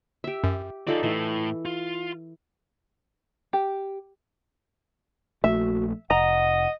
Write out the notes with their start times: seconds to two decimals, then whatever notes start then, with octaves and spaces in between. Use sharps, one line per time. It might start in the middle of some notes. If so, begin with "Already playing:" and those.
0.24 G4 E5
0.44 F#2
0.87 D#4 F4 G#4 A4 D5
1.03 A2 E3
1.65 F4
3.53 G4
5.44 A#1 A3 F#4 E5
6.10 F1 D#5 F#5 A#5